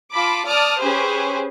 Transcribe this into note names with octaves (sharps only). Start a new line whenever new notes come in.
F4 A5 B5 D6
D5 A5 D#6 F6
C#4 G4 G#4 B4 C5